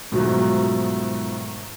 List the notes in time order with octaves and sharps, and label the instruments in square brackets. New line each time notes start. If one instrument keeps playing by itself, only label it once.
[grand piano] G#2 B2 D#3 F3 F#3 A3